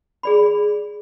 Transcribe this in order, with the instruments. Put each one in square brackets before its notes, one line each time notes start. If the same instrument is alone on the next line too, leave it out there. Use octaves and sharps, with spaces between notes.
[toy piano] G#4 D5 B5